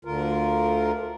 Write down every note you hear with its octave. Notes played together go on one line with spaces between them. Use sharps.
D2 D3 F4 A#4